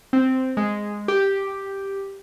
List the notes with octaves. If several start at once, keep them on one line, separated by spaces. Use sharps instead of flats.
C4
G#3
G4